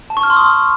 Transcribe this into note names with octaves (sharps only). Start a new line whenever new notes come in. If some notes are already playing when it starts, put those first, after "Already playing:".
A5
C#6
F6
C6
D#6